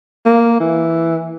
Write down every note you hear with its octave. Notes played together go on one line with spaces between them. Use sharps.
A#3
E3